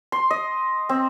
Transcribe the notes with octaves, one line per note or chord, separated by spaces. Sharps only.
C6
D#5
C4